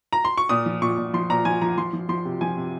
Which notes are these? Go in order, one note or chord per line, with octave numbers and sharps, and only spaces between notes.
A#5
C6
C#6
A#2 D#6
F3
A#2 C#6
A#2
F3 C6
A#2 A#5
F3 G#5
F3 A#5
F3 C6
F3
F3 C6
C3
F3 G#5
C3